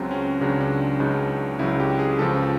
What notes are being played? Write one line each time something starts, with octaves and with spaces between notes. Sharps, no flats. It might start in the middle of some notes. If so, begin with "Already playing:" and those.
Already playing: C#2 C#3 F#3 C4
C#4
C#2 C#3 F#3 D4
C#4
D4
C#2 C#3 F#3 D#4
C#2 C#3 F#3 E4
G4
G#4
C#2 C#3 F3 A4